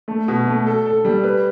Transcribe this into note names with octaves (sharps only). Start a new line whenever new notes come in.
A3
B2
A3
A4
A4
G3
B4